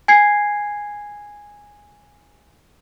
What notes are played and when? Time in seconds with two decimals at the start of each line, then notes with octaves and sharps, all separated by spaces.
0.08 G#5 G#6 C7